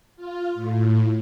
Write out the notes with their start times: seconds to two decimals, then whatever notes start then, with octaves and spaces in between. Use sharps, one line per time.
0.16 F4
0.55 A2